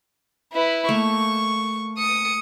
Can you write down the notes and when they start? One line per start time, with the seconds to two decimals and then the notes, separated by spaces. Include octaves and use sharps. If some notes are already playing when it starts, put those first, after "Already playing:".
0.53 E4 B4
0.89 A3 A#3 C#6
1.98 D#6 C#7